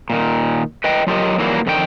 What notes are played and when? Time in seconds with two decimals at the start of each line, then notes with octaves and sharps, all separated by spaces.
0.10 A#2 D#3
0.84 B4 D#5 G5
1.07 F#3 F4 G4 A#4 D#5
1.38 A#2 D#3 E3 F#3 G3 A#3
1.66 F2 D3 D#3 F4 G5